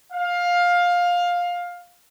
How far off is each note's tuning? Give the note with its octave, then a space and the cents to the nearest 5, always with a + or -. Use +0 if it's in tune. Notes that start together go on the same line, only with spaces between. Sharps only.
F5 +15